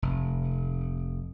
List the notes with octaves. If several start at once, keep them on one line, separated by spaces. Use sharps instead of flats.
F1